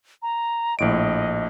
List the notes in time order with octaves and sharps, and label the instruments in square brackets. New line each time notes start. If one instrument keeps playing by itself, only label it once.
[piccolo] A#5
[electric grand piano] A#1 A2 D7 [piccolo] D#5